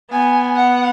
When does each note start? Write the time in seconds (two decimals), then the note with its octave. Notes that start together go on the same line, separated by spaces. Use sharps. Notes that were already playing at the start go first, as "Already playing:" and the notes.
0.11 B3 G#5
0.56 F#5